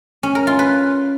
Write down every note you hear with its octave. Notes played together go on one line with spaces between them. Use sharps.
C#4
A#4
F4
B4